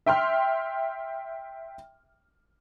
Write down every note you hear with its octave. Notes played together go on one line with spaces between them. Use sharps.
E5 G5 C6 F6